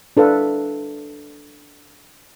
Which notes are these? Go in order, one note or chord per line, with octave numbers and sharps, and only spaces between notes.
D4 A4 B4 F5